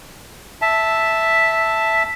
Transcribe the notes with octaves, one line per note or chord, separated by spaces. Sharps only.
E5 A5